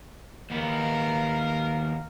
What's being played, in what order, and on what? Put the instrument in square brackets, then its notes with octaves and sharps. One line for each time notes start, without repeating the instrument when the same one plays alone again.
[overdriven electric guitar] D#2 B3 [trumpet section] A#4 F5